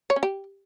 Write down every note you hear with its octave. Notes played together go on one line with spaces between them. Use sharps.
C#5
C#4
G4